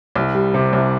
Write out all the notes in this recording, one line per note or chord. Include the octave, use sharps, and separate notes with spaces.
C2
G3
C3
C2